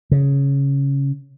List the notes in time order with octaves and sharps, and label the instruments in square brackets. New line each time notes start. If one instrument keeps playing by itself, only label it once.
[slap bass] C#3